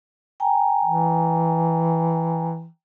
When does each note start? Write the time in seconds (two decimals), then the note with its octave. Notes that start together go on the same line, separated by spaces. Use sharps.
0.40 G5 G#5 A#5
0.85 E3